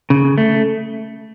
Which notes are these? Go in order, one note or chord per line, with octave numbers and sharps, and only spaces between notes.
C#3
A3